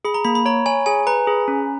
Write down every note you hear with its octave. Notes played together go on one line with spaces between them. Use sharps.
G#4 B5
A#5
A#3 B5
B5
C#5 A#5
C#5 G#5
G#4 G#5
B4 A#5
G#4
C#4